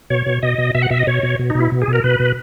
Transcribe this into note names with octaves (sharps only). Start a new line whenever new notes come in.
B2 C#5
B2
B2 D#5
B2
B2 E5
F#5
B2 E5
D#5
B2 C#5
B2
B2
D#4
B2
E4
B2
G#4
B2
A#4
B2 B4
B2